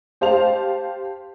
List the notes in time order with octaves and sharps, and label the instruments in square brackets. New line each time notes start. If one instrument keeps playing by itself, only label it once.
[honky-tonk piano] G4 C5 F5 A5 F7